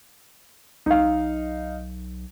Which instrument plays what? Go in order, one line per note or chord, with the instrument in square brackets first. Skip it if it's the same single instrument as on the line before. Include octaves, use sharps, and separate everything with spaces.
[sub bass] B1 [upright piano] D#4 F5